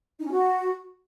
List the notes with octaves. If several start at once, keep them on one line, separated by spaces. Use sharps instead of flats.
D#4
C#4
F#4